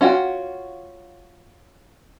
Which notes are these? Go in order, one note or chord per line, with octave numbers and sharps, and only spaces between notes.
C#4 F4 F#4 F#5 G5